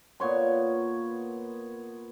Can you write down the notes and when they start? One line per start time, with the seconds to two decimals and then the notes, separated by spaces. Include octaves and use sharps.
0.20 A#2 B3 C#5 C6